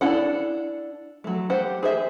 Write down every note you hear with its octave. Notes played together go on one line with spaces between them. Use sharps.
D4 E4 A4 F#5
F#3 A3
G4 C5 F#5
G#4 C5 E5